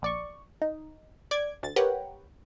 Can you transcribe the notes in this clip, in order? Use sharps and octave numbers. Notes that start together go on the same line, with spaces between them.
A#1 D5 C#6
D#4
D5 D6 G#6
D2 A6
G4 A#4 B4 C#5 F#5 G5